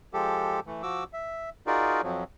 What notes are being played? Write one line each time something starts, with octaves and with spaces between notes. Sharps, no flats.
F3 G#3 G4 A4
E3 A3
F3 F#4 D6 E6
E5
D#4 F4 F#4 G#4 A#4 D5
F2 F3 F#3